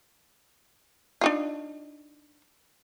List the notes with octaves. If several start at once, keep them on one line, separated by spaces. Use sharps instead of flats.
D4 D#4 F4